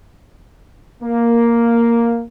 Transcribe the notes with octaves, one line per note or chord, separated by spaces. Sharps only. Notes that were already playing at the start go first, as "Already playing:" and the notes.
A#3